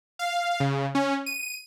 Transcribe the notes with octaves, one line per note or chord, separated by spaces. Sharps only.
F5
C#3
C#4
D#7